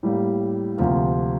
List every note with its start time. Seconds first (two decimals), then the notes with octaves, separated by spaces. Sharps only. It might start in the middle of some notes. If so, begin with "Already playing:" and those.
0.03 A2 G3 A#3
0.78 D2 C3 F3 A#3